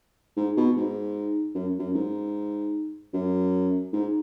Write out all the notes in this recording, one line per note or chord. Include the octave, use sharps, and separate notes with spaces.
G#2
B2
G#2
F#2
F#2
G#2
F#2
G#2